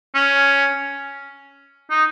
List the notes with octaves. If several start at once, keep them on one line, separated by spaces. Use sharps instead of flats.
C#4
D#4